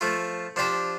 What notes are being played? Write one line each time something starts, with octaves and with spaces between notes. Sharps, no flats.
F3 A3 F4
F3 D4 G4 C5